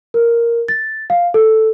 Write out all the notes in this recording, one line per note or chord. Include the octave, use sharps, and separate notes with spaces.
A#4
A6
F5
A4